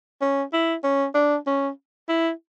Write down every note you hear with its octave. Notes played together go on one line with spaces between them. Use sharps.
C#4
E4
C#4
D4
C#4
E4